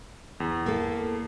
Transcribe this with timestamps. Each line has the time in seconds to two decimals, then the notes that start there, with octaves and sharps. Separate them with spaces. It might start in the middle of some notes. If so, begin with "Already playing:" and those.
0.40 E2
0.66 A#3 A4